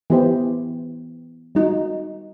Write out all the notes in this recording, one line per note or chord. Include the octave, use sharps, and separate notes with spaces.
E3 B3 E4 G4 C5
G3 D#4 F#4